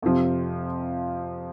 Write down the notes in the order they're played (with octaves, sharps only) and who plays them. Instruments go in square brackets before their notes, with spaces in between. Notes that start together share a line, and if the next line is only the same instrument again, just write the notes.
[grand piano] F2 C3 F3